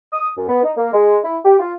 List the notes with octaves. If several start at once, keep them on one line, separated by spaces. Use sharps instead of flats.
D#6
F#2
B3
D#4
A#3
G#3
E4
G4
F4